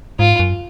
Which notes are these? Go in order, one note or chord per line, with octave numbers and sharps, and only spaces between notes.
G#2 F4
F#2